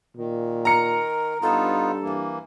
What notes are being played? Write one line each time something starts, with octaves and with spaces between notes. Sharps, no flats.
A#2 D#3
A#4 A#5 C#7
G2 B3 D#4 F4 A4
E3 A#3